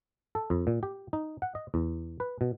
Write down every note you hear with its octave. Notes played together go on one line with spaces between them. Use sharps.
A4
F2
A#2
G4
D#4
F#5
D#5
E2
B4
B2